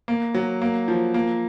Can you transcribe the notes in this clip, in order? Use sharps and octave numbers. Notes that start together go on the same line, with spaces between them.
A#3
F#3
A#3
F3
A#3